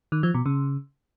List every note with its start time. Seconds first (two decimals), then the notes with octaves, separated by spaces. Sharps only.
0.12 D#3
0.23 F3
0.34 B2
0.46 C#3